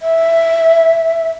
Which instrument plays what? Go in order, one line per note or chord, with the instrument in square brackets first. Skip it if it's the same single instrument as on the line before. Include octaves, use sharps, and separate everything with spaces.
[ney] E5